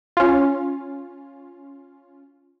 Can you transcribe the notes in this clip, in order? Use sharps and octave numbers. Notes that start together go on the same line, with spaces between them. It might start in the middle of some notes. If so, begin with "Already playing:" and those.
C#4 F4